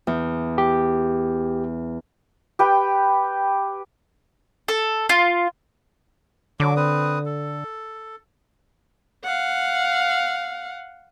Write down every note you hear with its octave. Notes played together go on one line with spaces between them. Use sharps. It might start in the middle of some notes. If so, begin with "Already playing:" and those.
E2
G4
G4 B4 G5
A4
F4
D3 F#3 D6
C4 B4 D#6
A4
F5 F#5